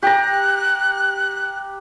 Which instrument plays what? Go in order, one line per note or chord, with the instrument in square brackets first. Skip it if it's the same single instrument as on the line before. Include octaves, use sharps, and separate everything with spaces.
[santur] G4 A#5 [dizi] F#6